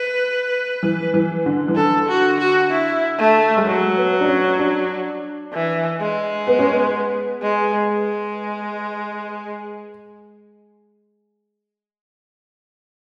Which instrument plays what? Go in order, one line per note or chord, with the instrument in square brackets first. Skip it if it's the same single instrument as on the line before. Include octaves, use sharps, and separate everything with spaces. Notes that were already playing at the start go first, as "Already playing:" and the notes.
Already playing: [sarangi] B4
[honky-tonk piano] E3
E3
D3
E3
[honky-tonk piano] D3 [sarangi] A4
[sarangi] F#4
F#4
E4
A3
[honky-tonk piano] G#3
[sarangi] F#3 [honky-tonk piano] A3
[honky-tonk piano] B3
D4
C#4
D4
[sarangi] E3
G#3
[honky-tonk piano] B3
C#4
B3
[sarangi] G#3
G#3